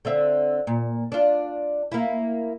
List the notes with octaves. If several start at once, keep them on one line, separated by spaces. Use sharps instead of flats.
D3 C4 E5
A#2
D4 F4
A#3 E4